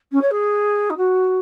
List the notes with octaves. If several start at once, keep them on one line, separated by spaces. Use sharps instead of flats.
C#4
C#5
G#4
D#4
F#4